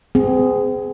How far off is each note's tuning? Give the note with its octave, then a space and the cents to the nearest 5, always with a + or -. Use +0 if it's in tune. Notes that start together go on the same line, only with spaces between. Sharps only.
C4 -40 G#4 +0